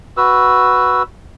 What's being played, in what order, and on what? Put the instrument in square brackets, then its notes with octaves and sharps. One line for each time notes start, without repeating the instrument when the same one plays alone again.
[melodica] F#4 B4 E6